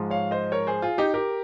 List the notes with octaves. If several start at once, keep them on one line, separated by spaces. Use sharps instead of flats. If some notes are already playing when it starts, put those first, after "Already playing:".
Already playing: G#2 F3 G#3
C#5 F5
C5 D#5
A#4 C#5
G#4 C5
F4 G#4
D#4 G4
G4 A#4